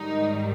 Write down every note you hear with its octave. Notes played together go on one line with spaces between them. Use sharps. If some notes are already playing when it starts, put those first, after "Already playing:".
Already playing: G#2 D#3 G3 D#4